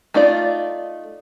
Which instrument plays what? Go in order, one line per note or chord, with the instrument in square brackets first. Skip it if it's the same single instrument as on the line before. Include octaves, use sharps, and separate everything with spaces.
[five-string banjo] A3 D#4 F4 D5